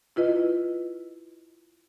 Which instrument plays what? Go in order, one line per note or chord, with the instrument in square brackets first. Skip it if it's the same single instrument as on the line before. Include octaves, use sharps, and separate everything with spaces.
[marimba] E4 F4 B4 D#5